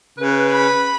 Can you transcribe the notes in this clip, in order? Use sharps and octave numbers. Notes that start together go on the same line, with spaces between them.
C#3 B4
B5